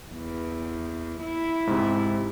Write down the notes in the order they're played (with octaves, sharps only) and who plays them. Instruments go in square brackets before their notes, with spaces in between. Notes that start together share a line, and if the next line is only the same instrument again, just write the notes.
[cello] E2
E4
[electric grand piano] G#2 C3